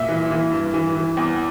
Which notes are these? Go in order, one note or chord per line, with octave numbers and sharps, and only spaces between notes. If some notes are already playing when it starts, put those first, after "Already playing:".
Already playing: A#2 E5
E3
E3
G2
E3
E3
E2